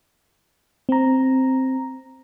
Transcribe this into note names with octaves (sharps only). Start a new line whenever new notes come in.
C4 A#5